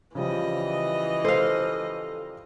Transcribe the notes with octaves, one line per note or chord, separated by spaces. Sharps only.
C#3 E3 F3 G3 D#5
A4 C5 F5